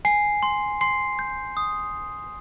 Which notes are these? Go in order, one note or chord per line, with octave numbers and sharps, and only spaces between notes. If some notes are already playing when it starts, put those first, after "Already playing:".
G#5 C7
C6
C6 C7
G6
D#6